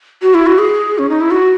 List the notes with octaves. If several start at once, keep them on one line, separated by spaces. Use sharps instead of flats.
F#4
E4
F#4
G#4
C#4
D#4
E4
F#4